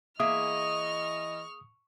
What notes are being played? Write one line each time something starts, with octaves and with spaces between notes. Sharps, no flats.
E3 A#3 G#4 D#5 E5 C#6 D#6 F6